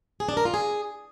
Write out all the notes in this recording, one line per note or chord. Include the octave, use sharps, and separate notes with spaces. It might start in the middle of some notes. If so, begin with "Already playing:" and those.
G#4
D4
A#4
F4
G#4